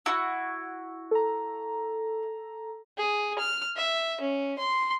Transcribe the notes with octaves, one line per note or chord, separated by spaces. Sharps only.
E4 F#4
A4 A#5
G#4
F6
E5
C#4
C6